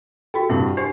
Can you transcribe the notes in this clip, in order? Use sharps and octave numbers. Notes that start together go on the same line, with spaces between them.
F#4 G4 A4 G5
G2 C3 E4 F#5 C#6
D4 G4 C5 C#6 C7